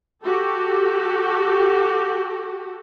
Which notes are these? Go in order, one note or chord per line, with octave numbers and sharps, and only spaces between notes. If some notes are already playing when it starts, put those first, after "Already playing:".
F#4 G4 A4